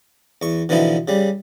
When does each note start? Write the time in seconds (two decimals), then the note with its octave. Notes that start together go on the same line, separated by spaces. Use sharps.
0.42 E2 C#6
0.69 B2 D3 E3 F3 D#4 E4
1.08 C#3 G3